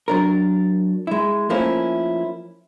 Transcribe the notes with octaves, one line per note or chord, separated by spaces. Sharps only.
F#3 D4 A#4
G#3 E4
F3 A3 A#3 C#4 E4